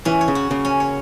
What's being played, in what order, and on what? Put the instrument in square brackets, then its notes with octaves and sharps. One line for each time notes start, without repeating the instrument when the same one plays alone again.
[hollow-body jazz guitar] E3 [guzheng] C#4
[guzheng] C#5
[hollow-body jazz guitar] C#3
[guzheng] F#4
[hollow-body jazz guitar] C#3 [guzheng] A#3
[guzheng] C#4
C#5